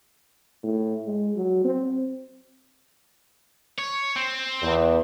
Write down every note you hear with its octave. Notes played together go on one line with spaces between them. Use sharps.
A2
G#3
F#3
C4
C#5
C4
E2